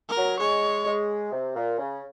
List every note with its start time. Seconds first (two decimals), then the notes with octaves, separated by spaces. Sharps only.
0.09 A#4
0.17 F#3
0.39 G#3 C#5
0.86 G#3
1.32 C3
1.56 A#2
1.79 C#3